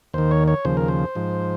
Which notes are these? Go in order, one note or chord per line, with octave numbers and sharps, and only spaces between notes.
D#2 D#3 C5
C#5
C#5
D#2 C#3 F3 C5
A#4
C5
G#2 F3